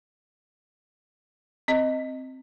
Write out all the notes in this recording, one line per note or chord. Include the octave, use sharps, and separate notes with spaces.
C4 D#5